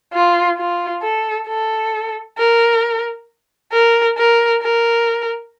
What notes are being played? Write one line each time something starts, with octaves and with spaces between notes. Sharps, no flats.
F4
F4
A4
A4
A#4
A#4
A#4
A#4